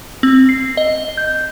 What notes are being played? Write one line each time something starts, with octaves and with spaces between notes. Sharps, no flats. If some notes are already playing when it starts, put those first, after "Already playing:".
C4
C7
D#5
G6